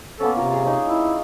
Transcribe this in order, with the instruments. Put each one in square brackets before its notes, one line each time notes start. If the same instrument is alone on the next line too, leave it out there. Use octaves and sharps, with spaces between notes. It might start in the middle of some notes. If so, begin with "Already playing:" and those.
[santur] A#3 B3 C#4 [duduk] A4
[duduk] C3 [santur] F4 A#4
[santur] G#4 D5
C#4 D#4
[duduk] E4